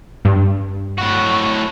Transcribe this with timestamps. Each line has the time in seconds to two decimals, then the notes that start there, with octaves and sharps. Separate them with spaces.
0.25 G2
0.98 A2 F#4